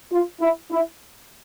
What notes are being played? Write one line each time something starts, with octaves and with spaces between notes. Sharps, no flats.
F4
E4
E4